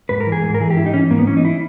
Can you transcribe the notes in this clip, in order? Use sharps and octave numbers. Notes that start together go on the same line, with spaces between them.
G#2 B4
A#4
E3
G#4
G#2
A#4
E3 G#4
G4
G#2 E4
D#4
E3 C#4
G#2 A#3
B3
E3 C#4
D#4
E4